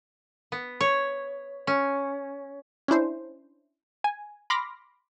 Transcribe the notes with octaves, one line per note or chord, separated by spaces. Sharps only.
B3
C#5
C#4
C#4 D4 E4 C5
G#5
B5 C6 D6 F6 A#6